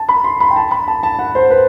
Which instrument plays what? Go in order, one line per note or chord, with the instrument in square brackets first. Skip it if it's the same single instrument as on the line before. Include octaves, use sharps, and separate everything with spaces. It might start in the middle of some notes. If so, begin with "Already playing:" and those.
Already playing: [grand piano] A5
B5
C6
B5
G5
A5
B5
A5
A5
F#5
C5
B4